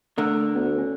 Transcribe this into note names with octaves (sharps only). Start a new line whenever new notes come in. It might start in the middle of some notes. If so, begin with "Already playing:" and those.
D3 A3 A#4
D2 B3
C#4